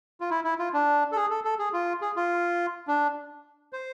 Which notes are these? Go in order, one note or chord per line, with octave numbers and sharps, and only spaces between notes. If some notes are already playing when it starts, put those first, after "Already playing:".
F4
E4
E4
F4
D4
A4
G#4
A4
A4
G#4
F4
G#4
F4
D4
C5